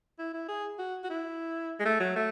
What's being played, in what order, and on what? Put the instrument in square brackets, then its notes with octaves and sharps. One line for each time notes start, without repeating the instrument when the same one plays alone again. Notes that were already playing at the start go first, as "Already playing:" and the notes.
[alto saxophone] E4
E4
G#4
F#4
F#4
E4
G#3
A3
F#3
A3